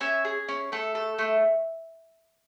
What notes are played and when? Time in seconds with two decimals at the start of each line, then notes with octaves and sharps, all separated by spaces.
0.01 C#4 E5 G#5
0.25 G#4
0.49 C#4
0.72 A3 A4
0.95 A4
1.19 A3